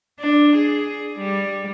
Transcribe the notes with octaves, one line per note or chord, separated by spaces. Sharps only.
D4
G#4
G3